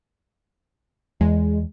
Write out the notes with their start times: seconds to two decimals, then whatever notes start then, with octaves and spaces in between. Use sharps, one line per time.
1.21 E2 G#3